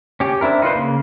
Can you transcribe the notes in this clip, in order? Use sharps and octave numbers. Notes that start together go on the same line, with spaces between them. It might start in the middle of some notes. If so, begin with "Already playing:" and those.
C#4 G4
C4 D4 E4 A#4
D#4 F4 B4 C5
C#3 A#3